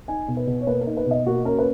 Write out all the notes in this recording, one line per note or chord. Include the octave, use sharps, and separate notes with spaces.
D#4 G#5
B2
B4
B2
C#5
A#3 B4
A#4
D#4
B4
B2 D#5
A#3 F#4
C#4 A#4
B4